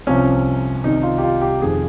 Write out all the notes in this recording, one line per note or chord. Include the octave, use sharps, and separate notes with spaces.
C2 C3 F3 C#4
C2 C3 D#3 D#4
F4
G4
F4
G4
F1 F2 D#3 G#4